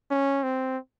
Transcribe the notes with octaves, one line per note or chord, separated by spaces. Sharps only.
C#4
C4